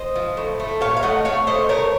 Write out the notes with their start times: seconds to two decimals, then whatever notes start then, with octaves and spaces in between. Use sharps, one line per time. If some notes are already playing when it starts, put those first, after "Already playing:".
Already playing: C5 D#5
0.16 F3
0.37 A2
0.60 A3
0.81 A#2 C#5 F5
0.97 F5
1.03 A3 D#5 F#5
1.25 A3 C#5 F5
1.47 A3 C5 D#5
1.69 A3 A#4 C#5